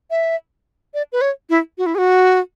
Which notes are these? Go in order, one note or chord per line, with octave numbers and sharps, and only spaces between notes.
E5
D5
B4
C#5
E4
F#4
E4
G#4
F#4